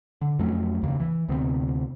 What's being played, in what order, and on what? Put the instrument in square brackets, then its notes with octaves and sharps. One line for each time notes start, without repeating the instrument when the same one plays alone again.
[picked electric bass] D3
F2 F#3 A3 C#4
F1 D#2 C#3 A#3
E3
D2 C3 B3 C4